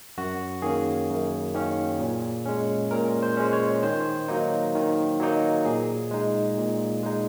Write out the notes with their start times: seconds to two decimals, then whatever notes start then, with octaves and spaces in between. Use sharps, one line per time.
0.18 F#2 F#4
0.62 D#3 A#3 C#4 G#4
1.09 F#2
1.54 D#3 A#3 C#4
1.99 A#2
2.45 G#3 C#4
2.91 A#2 A#4
3.23 C5
3.37 G#3 C#4
3.53 C#5
3.83 D#3 C5
4.28 F#3 A#3 D#4
4.75 D#3
5.20 F#3 A#3 D#4
5.65 A#2 G#4
6.11 G#3 D#4
6.58 A#2
7.03 G#3 D#4